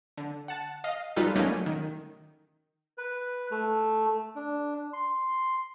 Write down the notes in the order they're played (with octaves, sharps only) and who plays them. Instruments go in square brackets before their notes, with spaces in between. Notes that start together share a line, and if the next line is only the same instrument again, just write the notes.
[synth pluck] D3
F#5 A5
D#5 F5
G3 D#4 F4 G4 A4 B4
F#3 G3 A3 A#3 C#4 D#4
D#3
[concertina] B4
A3
D4
C6